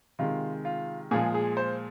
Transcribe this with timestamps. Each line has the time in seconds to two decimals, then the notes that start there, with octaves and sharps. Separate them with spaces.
0.19 C3 D#3 G#3 F4
0.65 F4
1.11 A#2 F3 G#3 G#4
1.34 G#4
1.57 C5